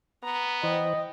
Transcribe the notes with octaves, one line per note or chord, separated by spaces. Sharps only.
B3 A#5
E3 C5 D#5 G5